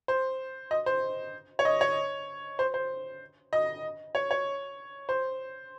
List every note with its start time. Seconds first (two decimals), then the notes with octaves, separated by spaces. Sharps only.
0.08 C5
0.71 D#5
0.86 C5
1.59 C#5
1.65 D#5
1.81 C#5
2.59 C5
2.74 C5
3.53 D#5
4.15 C#5
4.31 C#5
5.09 C5